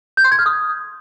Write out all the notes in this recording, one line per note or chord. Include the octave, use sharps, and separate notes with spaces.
G6
C6
G#6
F6
D#6